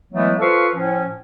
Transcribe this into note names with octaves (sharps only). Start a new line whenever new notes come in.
E3 F#3 G#3 A3 B3 E4
F4 A4 B4 C5 F5 C#6
A2 F3 C#4